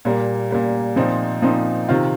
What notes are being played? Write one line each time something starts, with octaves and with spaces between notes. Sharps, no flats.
A#2 G3 A#3
A#2 G3 A#3
A#2 F3 C4 D#4
A#2 F3 C4 D#4
C3 D#3 C4 F4